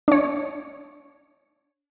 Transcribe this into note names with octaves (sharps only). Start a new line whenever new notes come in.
D4 C#5